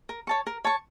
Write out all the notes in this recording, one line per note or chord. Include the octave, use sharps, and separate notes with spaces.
A#4
C#5 A5 C#6
A#4
C#5 A5 C#6